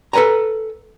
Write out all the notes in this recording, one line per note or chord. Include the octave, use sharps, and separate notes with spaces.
A4 B4 C5 G#5 A#5